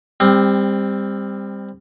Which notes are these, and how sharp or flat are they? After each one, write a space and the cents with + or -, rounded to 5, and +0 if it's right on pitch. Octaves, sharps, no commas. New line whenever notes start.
G3 +25 C4 +0